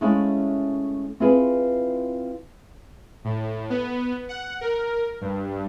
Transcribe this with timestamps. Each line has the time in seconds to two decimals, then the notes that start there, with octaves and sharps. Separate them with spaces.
0.01 G#3 A3 C#4 E4 C5 F5
1.20 C4 E4 F4 G#4 B4
3.25 A2
3.70 B3
4.29 F#5
4.61 A#4
5.21 G2